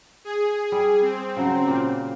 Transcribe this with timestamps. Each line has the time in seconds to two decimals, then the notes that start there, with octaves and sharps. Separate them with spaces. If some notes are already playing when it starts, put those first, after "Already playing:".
0.25 G#4
0.72 G3
1.02 C4
1.37 C#3 F#3
1.67 A#2 A#3 G4